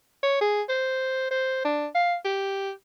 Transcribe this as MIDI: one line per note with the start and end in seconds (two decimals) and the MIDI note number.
0.23 0.40 73
0.41 0.62 68
0.69 1.27 72
1.31 1.62 72
1.65 1.87 62
1.95 2.16 77
2.25 2.71 67